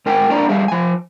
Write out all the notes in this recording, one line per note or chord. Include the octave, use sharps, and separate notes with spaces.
G#2 A#4 G5 G#5
A#3 D4 A#4 C#5 D5 A#5
G3 G#4 E5 F5
F3 G#5